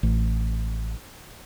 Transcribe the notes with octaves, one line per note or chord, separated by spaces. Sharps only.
A1